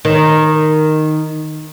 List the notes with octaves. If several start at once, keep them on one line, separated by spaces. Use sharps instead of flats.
D#3